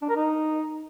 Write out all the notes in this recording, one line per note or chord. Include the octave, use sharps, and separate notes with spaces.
D4
A#4
D#4